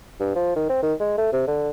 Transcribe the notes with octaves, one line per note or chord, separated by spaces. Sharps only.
G2
F3
D#3
C4
D#3
G#3
A3
C3
D3